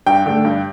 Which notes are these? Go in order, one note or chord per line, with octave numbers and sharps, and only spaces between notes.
G2 G5
D3 A3
G2